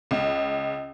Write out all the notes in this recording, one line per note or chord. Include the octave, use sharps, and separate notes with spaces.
C#2